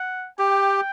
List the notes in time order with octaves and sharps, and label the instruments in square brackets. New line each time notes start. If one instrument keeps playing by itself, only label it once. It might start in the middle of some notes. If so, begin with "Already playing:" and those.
Already playing: [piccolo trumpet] F#5
[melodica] G4 [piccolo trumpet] G5